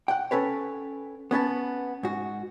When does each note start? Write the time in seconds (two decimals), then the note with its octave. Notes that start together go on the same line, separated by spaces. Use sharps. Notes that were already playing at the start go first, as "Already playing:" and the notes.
0.08 F#5 G5
0.31 C#4 A4 B4 C#5
1.31 B3 C#4 B4 A5
2.03 G#2 F#4